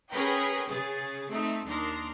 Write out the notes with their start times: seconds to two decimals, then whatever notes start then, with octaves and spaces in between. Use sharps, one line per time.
0.11 C#4 G#4 A#4 B4 G5 B5
0.68 C#3 G#4 A6
1.29 A3 C4 D#4
1.66 D#2 D4 D#4 A#4 C6